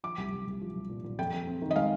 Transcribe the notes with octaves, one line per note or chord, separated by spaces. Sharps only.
F3 D6
C2
C2
C2
F3
C2
A#2
A#2
F2 G5
F2
C4
D#3
D#5
G#3 F5